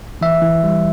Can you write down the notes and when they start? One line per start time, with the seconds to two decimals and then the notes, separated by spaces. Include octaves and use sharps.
0.21 E3 E5
0.42 E3
0.64 G3